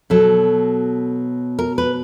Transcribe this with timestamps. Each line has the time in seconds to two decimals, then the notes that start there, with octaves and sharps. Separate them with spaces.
0.10 B2 F#3 A4
1.59 A#4
1.78 B4